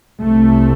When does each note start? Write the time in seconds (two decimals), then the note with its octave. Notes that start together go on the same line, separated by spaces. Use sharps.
0.22 C2 C3 A3